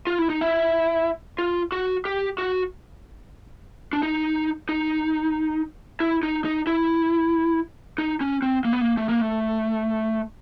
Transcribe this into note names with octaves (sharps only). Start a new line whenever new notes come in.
F4
E4
D#4
E4
F4
F#4
G4
F#4
D4
D#4
D#4
E4
D#4
D#4
E4
D#4
C#4
C4
A#3
B3
A#3
A3
A#3
A3